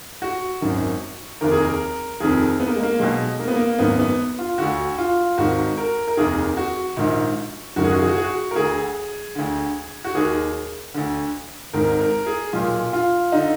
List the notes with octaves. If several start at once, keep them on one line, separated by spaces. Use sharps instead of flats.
F#4
G#1 F#2 D#3
F1 D#2 D#3 A#4
G#4
A#4
F1 F2 D#3 G#4
B3
A#3
G#3
A#3
B1 B2 G#3
A#3
B3
A#3
G#1 F#2 D#3 B3
B3
F4
D2 D3 F#4
F4
G#1 G#2 D#3 F#4
A#4
A#4
F1 D#2 D#3 G#4
F#4
A#1 G#2 D#3
F#1 F#2 D#3 F#4
G#4
F#4
G#4
F#4
G#4
F#4
A#4
D2 D3 G#4
D2 D3
F#4
D#2 D#3 G#4
D2 D3
G#1 G#2 D#3 A#4
A#4
G#4
B1 A#2 F4
F4
D3 D#4